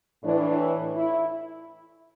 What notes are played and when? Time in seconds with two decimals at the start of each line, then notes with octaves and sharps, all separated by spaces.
0.22 A2 E3 D4
0.95 E4